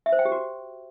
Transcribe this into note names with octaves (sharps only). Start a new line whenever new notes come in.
E5
C5
G5
G4
F#4